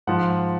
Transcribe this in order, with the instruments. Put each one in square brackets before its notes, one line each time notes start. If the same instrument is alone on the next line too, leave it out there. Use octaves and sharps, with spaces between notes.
[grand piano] G#2 F3 F#5